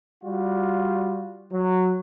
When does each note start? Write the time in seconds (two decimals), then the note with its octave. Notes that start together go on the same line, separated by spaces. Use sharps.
0.23 G3 F4 F#4
1.51 F#3